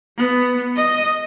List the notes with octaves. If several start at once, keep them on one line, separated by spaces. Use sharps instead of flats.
B3
D#5